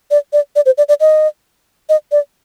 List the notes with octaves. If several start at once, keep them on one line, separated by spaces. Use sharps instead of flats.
D5
D5
D5
C5
D5
D5
D#5
D#5
D5